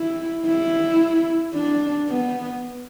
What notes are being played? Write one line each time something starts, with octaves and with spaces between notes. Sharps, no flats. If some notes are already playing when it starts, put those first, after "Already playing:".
Already playing: E4
E4
D4
B3